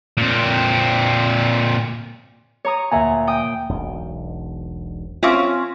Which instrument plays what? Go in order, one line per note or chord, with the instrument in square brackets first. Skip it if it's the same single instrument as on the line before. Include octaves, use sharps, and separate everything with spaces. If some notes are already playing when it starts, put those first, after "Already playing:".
[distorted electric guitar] A#2 C4
[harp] C#5 A#5 D#6
[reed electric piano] D2 E5 G#5 [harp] A#2 F#5 A#5
[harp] G5 D#6
[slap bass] E1 B1
[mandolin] C4 C#4 [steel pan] F4 E5 D6